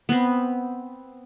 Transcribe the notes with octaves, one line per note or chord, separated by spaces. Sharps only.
B3 C4